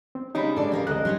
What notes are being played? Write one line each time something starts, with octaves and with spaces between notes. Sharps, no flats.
C4
C#3 G3 G#3 D#4 B5
D4 A4 D5
G4 A#4 F5
D2 A#4 D#5 F#6
G3 D#4 C#5 C6